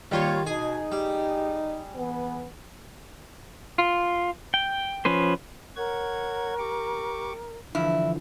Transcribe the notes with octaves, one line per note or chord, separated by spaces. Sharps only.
D#2 D#3 G3 F4 G4 C#5
B2 D#4 G#4 G#5
G3 G4
E3 B3
F4
G5
F3 C#4 B4 C5
A#4 C#5 F#5 G#6
G4 C#6 D6
G2 D3 E3 F3 E4